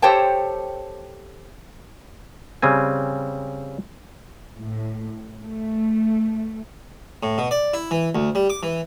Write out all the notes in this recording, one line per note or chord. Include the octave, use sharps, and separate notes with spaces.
G4 A4 C5 C#5 G5 A5
C#3 G3 C4 G#5
A2
A3
A2
B2
D5
E4
E3
D2
G3
D6
E3